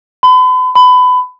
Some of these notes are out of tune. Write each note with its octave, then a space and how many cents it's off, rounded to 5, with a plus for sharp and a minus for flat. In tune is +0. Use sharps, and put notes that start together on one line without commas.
B5 +40
B5 +25